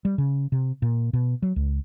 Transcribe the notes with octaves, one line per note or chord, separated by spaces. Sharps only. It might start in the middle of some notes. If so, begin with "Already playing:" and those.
G3
C#3
C3
A#2
B2
F#3
C#2